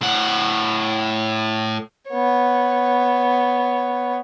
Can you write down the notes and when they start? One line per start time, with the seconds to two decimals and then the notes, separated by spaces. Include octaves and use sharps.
0.01 A2 F#5
2.09 B3 C#5